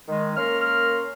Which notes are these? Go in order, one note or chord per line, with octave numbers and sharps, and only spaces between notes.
D#3 G#3
A#3 C#4 A#4 C6 F6